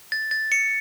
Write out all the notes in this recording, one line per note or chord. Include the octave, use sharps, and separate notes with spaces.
A6
A6
C#7